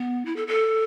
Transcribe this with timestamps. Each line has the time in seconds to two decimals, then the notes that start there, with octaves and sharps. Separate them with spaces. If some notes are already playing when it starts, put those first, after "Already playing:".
Already playing: B3
0.26 E4
0.36 A4
0.47 A4